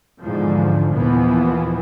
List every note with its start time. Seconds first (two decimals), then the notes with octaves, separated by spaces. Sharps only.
0.22 E2 G#2 D3 F3
0.91 D#2 A#2 E3 F3 B3